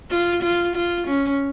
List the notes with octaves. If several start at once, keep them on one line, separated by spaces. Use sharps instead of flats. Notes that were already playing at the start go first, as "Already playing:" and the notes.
F4
F4
F4
C#4